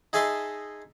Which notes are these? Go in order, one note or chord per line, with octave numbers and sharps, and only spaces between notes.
D#4 G#4 D#5 E5 A5 C6